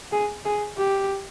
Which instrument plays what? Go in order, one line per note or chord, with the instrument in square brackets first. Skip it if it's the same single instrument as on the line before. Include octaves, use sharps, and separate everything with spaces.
[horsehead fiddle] G#4
G#4
G4